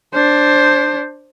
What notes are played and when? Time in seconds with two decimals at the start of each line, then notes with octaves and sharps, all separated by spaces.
0.14 D4 C5